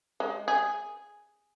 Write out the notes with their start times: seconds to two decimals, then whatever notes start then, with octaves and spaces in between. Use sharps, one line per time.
0.20 G#3
0.48 G#4